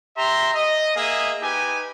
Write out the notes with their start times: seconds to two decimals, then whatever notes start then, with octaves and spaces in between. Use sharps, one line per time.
0.17 G4 E5 A#5 C6
0.55 D#5
0.96 A#3 G#4 D#5 E5
1.42 D#4 G4 B4 G#5